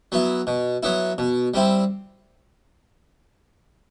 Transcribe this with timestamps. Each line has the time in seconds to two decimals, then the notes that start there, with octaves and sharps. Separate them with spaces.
0.12 F#3 B3 E4
0.47 B2
0.83 F#3 B3 E4
1.18 B2
1.54 G3 C4 E4